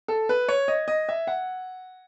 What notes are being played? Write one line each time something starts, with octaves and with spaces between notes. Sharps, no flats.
A4
B4
C#5
D#5
D#5
E5
F#5